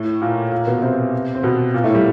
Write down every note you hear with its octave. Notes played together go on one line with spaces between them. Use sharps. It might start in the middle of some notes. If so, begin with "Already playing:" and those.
Already playing: A2 A3
A#2 A#3
A#2 A#3
B2 B3
C3 C4
C4
B2 B3
A#2 A#3
A2 A3
G3